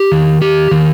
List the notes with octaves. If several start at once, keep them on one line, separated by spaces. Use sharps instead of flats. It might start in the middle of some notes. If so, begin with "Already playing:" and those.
Already playing: G4
D#3
G4
D#3